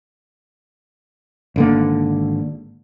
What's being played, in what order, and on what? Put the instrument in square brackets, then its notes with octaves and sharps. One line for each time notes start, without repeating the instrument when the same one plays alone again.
[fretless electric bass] G#1 D3 A#3